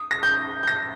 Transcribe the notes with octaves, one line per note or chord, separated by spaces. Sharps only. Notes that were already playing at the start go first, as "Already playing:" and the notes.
Already playing: D#6
A#6
G6
G6
A#6